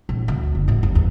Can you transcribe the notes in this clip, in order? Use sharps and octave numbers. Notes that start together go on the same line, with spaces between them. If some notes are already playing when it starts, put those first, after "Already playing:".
A#1
D2
F#1
F#2 A2
G1
E2